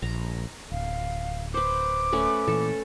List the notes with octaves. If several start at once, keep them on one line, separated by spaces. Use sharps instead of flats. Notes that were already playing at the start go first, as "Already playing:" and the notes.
A#1 A#5
D1 F5
B4 C5 D6
A3 C#4 B4
A#2 E3 A4